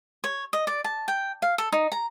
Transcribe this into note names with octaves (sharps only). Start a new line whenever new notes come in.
C#5
D#5
D5
A5
G5
F5
A4
D#4
A#5